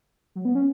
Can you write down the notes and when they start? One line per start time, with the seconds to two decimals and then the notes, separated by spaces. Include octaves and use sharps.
0.36 F#3
0.45 B3
0.55 C#4